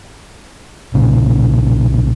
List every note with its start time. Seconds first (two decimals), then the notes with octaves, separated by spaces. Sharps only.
0.94 B1 A#2 C#3